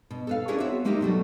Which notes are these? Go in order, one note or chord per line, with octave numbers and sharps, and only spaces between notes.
B2
A4 B4 F5
C#4 D4 E4 G#4 A#4 B4
B3 C4 F#4 C#5 E5
G#3 A#3 D#4 G4 A#4 E5
B2 F#3 G3 A3